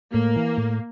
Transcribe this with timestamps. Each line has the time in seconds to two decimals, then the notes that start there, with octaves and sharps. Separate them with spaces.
0.14 A2 A#3
0.36 E3
0.57 A2